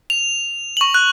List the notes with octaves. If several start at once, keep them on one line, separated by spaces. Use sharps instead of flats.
F7
C#6 F#7
F#6